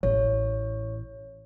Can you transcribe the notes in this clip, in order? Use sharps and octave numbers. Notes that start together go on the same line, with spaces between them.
A1 C#5